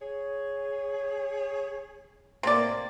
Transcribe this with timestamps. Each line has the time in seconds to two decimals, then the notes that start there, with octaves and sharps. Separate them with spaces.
0.01 G#4 C#5
2.43 A2 C3 A#3 D5